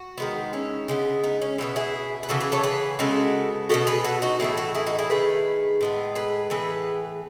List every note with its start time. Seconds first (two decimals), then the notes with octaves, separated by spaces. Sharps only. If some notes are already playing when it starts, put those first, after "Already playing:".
Already playing: F#4
0.18 D#3 G#3 B3
0.53 C#4 E4
0.88 C#3 G#3 B3
1.24 B3 D#4
1.42 C#4
1.58 B2 F#3 B3 C#4 E4
1.76 E4 G#4
2.23 B4
2.29 C#3 E3 B3 F#4 A4
2.40 G#4 B4
2.52 A4 C#5
2.63 G#4 B4
2.99 C#3 G#3 B3 F#4 A4
3.69 B2 G#3 B3 F#4 A4
3.87 G#4 B4
4.04 F#4 A4
4.22 D#4 F#4
4.40 A2 E3 A3 E4 G#4
4.57 F#4 A4
4.75 E4 G#4
4.87 D#4 F#4
4.99 E4 G#4
5.10 D#3 A3 G#4 B4
5.81 A2 G#3 B3
6.15 G#4 B4
6.50 A2 E3 B3 G#4 B4